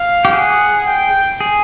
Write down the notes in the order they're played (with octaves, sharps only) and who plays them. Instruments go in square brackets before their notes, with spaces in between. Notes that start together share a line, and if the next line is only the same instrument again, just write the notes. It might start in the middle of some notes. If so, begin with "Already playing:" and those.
Already playing: [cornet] F5
[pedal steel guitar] G4
[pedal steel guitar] G#4 [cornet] F#5
[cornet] G5
[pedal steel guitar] G#4